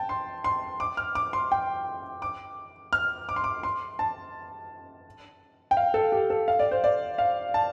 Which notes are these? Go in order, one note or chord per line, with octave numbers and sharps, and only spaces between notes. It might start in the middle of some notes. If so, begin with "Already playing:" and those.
Already playing: G5 A5
C6
C6
D6
F6
D6
C6
G5
D6
F6
D6
C6
D6
C6
A5
G5
F5
A4
G4
A4
F5
D5
C5
D5
F5
A5